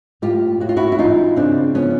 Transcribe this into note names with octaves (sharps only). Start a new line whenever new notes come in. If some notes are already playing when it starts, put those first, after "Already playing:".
A2 F4 G4
A2 F#4
F4
E4 F#4
E4
E3 D#4 F4
C#3 C4 D4
F3 B3 C#4